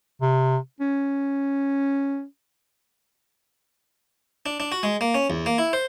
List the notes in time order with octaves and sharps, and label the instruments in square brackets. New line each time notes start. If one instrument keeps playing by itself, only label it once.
[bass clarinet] C3
C#4
[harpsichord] D4
D4
F#4
G#3
A#3
C#4
E2
A#3
E4
C5